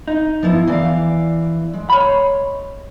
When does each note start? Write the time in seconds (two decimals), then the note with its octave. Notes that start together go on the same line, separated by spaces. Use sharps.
0.08 D#4
0.43 F3 B3 E4
0.67 E2 E3 D5 F5
1.73 G#3
1.90 C#5 B5